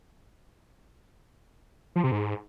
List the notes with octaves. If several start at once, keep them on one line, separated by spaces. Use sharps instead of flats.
F3
C3
G#2